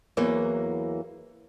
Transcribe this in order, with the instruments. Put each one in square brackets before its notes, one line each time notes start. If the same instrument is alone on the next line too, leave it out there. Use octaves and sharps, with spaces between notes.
[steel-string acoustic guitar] E2 E3 F#3 A#3